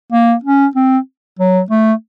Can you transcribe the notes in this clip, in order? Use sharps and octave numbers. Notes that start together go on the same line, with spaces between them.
A#3
C#4
C4
F#3
A3